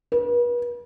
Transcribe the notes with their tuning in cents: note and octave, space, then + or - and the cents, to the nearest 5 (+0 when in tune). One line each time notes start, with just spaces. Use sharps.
B4 -40